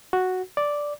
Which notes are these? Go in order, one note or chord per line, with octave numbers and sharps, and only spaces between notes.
F#4
D5